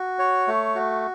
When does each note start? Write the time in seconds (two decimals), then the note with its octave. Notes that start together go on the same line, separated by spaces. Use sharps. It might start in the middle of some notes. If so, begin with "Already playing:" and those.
Already playing: F#4
0.19 C#5
0.47 A3
0.75 F#4